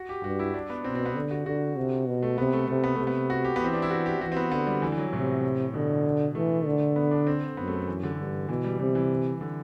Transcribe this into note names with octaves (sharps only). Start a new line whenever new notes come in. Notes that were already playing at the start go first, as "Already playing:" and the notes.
Already playing: F#4
G4
G2 F#4
E4
D4
B3
B2 C4
C4
B3
D3
F#4
D3 F#4
C3
B2
A3
C3 B3
A3
C3 A3
B3
C3 A3
B3
F#4
G4
B3
E3 C4
D4
E4
F#4
G4
E3 F#4
C4
B3
D3 B3
G3
E3
E3
F#3
A2 C3
B2 D3
E3 A3
D3
B3
D4
C4
F#2 B3
A3
E3
D3
G2
B2 E3
G3
C3 G3
E3
D3